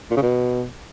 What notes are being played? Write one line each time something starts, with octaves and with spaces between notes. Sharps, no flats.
A#2
C#3
B2